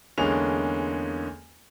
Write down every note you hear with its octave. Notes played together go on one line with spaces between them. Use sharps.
E2 D3 G#3 A#3 C#4 F7